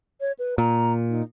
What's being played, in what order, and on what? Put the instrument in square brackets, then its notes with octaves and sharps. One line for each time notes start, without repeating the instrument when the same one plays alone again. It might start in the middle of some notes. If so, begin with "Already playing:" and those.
[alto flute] C#5
B4
[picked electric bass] A#2 [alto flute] A#5
[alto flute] D#4